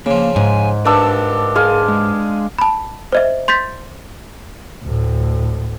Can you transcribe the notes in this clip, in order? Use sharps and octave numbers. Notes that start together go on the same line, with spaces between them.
C#3 F3 A#3
G#2 G#5
G2 D4 A#4 A5 E6
G#4 F5 C6
G#3
A5 B5
C5 D#5 E5
C6 G6 A6 B6
D2 A2